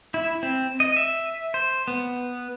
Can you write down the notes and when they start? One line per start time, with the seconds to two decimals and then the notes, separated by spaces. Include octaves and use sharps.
0.14 E4
0.43 C4
0.80 D#5
0.97 E5
1.54 C5
1.88 B3